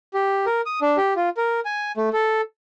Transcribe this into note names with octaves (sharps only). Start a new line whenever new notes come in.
G4
A#4
D#6
D4
G4
F4
A#4
G#5
A3
A4